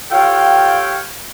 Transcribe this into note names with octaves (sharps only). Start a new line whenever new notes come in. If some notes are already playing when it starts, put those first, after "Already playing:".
F4 G4 A4 C#5 F5 G5